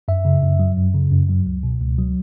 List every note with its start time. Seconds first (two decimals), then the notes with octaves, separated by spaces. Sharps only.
0.08 F#2 E5
0.25 C#3
0.43 F#2
0.59 F#3
0.78 F#2
0.94 C#3
1.12 F#2
1.29 F#3
1.46 C#2
1.63 B2
1.80 C#2
1.98 F#3